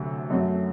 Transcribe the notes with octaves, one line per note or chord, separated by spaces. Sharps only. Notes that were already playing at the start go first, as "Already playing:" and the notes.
Already playing: D2 C3 F#3 A3
F#2 F#3 A3